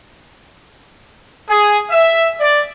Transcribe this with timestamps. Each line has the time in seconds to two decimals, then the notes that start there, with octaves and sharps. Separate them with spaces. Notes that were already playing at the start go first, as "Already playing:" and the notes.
1.49 G#4
1.91 E5
2.40 D5